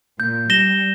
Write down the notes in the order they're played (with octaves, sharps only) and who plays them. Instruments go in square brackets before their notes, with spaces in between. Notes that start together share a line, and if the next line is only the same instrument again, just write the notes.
[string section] A#2 [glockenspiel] G6
[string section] G3 [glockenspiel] A#6 E7 G7